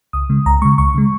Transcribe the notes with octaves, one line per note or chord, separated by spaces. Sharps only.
C#2 D#6
C#3 G#3
C#2 A#5
C#3 G#3 C#6
C#2 C#6
C#3 G#3